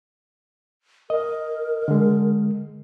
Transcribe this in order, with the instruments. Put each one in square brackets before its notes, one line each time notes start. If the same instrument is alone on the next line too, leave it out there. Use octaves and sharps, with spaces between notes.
[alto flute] A#4 [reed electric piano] D#5
[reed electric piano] D3 G#3